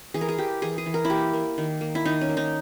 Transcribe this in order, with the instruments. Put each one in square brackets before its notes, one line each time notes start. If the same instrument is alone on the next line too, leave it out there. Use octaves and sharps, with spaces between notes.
[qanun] E3 G#4
A#4
G#4
E3 G4
E3 G#4
G#4
E3
A#4
E4
A#3 G4
A#3
D#3
A#3
E4
D#3 D#4
C#4
A#3
D#4